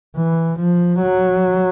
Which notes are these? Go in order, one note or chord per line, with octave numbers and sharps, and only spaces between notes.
E3
F3
F#3